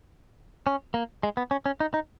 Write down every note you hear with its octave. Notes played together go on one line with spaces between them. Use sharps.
C#4
A#3
G#3
B3
C#4
C#4
D#4
D#4